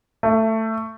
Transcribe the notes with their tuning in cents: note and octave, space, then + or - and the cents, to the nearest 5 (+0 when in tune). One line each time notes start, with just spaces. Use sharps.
A3 +15